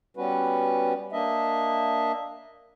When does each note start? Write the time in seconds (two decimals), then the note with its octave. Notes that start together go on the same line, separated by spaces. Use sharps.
0.17 G3 B3 C#4 F#4 B4
1.12 A#3 D4 D#5 E5